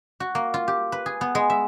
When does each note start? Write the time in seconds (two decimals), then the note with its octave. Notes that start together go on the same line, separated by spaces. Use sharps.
0.20 F#4
0.35 A#3
0.54 F4
0.68 G4
0.92 B4
1.06 G#4
1.21 B3
1.35 G#3
1.50 E5